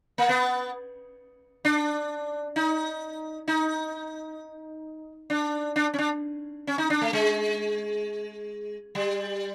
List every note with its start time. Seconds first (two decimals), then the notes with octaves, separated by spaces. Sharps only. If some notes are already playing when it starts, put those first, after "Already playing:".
0.18 A#3
0.29 B3
1.65 D4
2.56 D#4
3.48 D#4
5.30 D4
5.76 D4
5.94 C#4
5.99 D4
6.67 C#4
6.78 D#4
6.90 D4
7.01 A3
7.13 G#3
8.95 G3